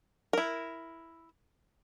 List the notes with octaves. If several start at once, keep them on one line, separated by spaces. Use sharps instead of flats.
E4 A#4